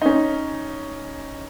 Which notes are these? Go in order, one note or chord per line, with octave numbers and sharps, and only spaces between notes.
C#4 D#4